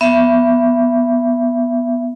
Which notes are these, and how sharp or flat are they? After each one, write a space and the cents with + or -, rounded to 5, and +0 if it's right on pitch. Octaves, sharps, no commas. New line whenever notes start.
B3 -10 E5 +20